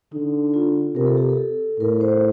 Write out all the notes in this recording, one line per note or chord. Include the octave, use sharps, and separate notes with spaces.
D3 D#4
F4
C3 A#4
A4
G4
A4
A2 A#4
C5